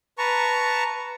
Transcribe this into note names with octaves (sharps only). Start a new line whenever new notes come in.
B4 A5 A#5 C#6